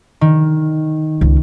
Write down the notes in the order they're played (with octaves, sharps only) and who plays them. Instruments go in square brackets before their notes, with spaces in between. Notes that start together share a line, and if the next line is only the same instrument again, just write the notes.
[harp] D#3
[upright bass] C#2